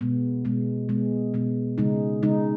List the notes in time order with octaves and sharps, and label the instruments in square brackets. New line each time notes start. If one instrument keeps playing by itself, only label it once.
[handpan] B2 G#3 B3
B2 G#3 B3
B2 G#3 B3
B2 G#3 B3
C#3 G#3 D#4
C#3 G#3 D#4